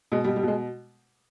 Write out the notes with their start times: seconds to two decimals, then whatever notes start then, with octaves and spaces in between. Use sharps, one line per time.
0.12 B2 G#3
0.24 G3
0.28 B2
0.36 G3
0.43 B2 G#3